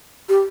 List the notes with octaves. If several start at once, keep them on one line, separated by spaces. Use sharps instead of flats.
G4